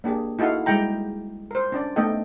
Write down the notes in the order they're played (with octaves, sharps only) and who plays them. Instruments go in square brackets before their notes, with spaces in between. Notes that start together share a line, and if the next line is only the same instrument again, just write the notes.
[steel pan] A#3 D4 G4 G#4
D#4 E4 F#4 A4 F5 F#5
G3 G#3 E4 G5 A#5
A#4 C5
C#4 D4 D5
A3 B3 D#4 A4 D#5 G5